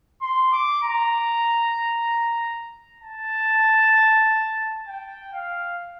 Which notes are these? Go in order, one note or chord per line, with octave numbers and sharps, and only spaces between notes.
C6
D6
A#5
A5
G5
F5